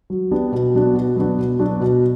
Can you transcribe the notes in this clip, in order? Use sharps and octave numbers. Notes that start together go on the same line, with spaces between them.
F#3
B3 D4 G4
B2
F#3 B3 D4 F#4
B2
F#3 B3 D4 F#4
B2
F#3 B3 D4 F#4
B2